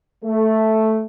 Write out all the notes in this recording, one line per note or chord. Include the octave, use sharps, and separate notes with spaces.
A3